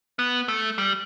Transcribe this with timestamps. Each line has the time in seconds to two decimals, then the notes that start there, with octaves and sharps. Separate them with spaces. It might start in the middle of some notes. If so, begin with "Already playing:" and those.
0.19 B3
0.48 A3
0.78 G3